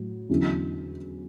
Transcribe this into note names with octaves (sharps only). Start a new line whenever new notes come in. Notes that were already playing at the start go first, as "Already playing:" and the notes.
Already playing: A2 F#3
E2 D3 F#3 C#4 E4